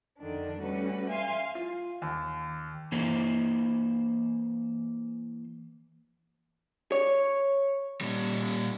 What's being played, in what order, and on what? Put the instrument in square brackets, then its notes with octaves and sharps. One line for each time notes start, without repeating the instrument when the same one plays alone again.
[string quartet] F2 D3 D#3 D4
G3 A3 C#4 F#4 B4
E5 F5 G#5 C6
[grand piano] F4
D#2
[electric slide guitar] E3 A#3 C5
[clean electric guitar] C#5
[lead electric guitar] A#2 G3